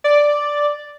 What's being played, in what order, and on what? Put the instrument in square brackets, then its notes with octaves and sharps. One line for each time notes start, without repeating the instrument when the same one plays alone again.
[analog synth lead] D5